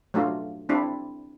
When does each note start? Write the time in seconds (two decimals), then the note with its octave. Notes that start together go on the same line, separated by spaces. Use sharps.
0.14 F#3 A3 D4 F4
0.69 C4 D4 E4